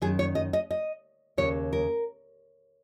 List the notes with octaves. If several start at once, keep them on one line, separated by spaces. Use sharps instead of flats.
F#2 D#3 G#4
C#5
D#5
D#5
D#5
D#2 C#3 C#5
A#4